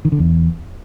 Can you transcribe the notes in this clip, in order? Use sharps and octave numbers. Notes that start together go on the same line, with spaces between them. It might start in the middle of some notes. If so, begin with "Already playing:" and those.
D#3
D3
E2